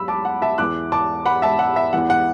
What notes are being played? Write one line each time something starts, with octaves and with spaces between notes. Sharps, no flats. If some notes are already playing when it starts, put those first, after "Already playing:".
Already playing: E2 F#3 B5 E6
A5 D6
F#5
E5 A5
E2 E3 D6 F#6
A5 D6
F#5 B5
E5 A5
F#5
E5
E2 E3 F#5
F#5